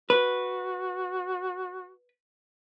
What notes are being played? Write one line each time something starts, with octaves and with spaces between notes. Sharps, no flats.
F#4 B4